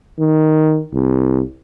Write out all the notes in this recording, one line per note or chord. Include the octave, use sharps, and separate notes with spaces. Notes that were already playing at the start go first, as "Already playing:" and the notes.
D#3
C2